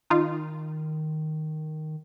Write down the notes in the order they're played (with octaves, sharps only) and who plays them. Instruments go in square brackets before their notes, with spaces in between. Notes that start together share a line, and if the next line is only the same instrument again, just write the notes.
[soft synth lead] D#3 [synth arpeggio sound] D#4 F4